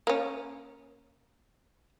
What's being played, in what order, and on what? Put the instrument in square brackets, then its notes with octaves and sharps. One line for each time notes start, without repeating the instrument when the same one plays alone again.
[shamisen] A#3 C#4